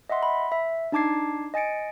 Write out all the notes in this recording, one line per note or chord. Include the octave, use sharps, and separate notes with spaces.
D#5 E5 F#5 C6
B5
E5
D4 D#4 A5 D6 G#6 C7
D#5 G#5 A6 C#7 D7